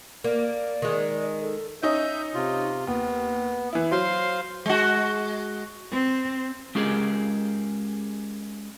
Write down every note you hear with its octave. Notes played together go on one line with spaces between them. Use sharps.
A#3 D5
D#3 G#3
A4
C#4 D#4 D#5 E5 G6
C3 F4
D#2 B3
E3 E4
F#3 C5 F5 C6
G#3 F#4
C4
G#3 C#4 F4 G4 G#4 A#4